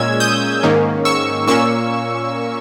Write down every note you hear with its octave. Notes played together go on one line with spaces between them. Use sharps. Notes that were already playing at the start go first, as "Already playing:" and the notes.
Already playing: A#2 G#3 C#4 E6 G#6
D#6 G6
G#2 D#3 A#3 C#4
C#6 E6
A#2 A#3 C#4 C#6 E6